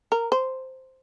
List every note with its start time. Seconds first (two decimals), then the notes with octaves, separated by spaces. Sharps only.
0.12 A#4
0.32 C5